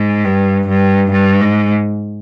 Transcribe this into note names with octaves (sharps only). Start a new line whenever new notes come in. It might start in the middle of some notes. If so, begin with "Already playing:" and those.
Already playing: G#2
G2
G2
G2
G#2